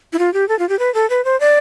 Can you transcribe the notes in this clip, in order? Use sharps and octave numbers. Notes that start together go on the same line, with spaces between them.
E4
F4
G4
A4
F4
G4
B4
A4
B4
C5
D5